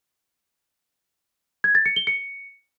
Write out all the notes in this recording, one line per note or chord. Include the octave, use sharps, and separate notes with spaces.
G#6
A6
C#7
G7
C#7